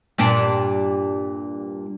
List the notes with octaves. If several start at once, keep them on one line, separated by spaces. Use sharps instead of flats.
G2 A#2 D4